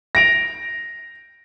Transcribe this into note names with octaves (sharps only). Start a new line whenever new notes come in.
A#6 D7 F7